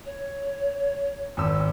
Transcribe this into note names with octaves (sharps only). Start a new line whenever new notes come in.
C#5
G#1 E6